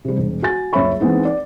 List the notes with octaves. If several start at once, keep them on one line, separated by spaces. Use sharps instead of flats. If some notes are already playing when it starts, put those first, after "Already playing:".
C3 G3
E1
F#4 G#5 A6
F#1 C#2 C#5 E5 B5 C#6
E3 G#3 B3 C4 D#4
D5